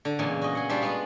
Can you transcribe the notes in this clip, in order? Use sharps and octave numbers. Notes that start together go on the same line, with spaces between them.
D3
E2 A#2 C#3 G#3 G#5
F#4 D#5
G#4 F#5
G3 D4 F4 F#4 C5 E5
G#3 B3 D4 F4